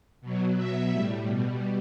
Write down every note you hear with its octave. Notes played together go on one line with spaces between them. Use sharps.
B2 F#3
B2 F#3 E5
A2 G3
B2 G3